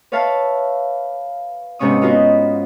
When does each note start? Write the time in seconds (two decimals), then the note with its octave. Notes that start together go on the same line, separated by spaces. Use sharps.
0.12 B4 C#5 E5 F5 A5
1.79 G#2 C3 B3 C#4 C#6 D#6
2.02 B3 D#4 F4 F#4 B4